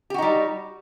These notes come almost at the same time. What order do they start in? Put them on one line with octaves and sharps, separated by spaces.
G4 F#4 D#4 G3